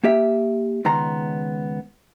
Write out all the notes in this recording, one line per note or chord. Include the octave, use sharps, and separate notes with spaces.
A#3 G4 E5
C#2 D#3 B3 A#5 C6